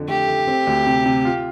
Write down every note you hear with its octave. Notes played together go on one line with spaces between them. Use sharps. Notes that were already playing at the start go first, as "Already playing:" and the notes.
Already playing: F2 D3
A3 G4
A3
C4
D2
C3
C3
F4